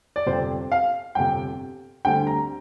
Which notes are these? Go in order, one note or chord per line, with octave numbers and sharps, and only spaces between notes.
D5
G1 F2 C3 C5
F5
G1 F2 C3 G5
D2 D3 G3 C4 G5
A#5